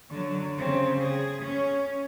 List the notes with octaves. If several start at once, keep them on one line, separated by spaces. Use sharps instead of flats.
D3 F#3
C#3 C4
G#4
C#4